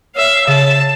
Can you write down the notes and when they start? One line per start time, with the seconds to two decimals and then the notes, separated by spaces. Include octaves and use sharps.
0.16 C#5 E5 F5
0.47 C#3 A5